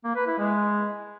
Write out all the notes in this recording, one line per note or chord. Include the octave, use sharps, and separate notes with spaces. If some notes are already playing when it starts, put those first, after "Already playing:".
A#3
B4
E4
G#3